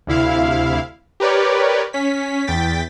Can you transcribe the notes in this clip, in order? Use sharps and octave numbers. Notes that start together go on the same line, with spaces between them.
D2 C3 E4 F5
G4 A#4 B4 C#5 D5
C#4 B6
E2 G5 A6 B6